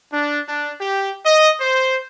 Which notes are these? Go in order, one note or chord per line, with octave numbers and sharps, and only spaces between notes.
D4
D4
G4
D#5
C5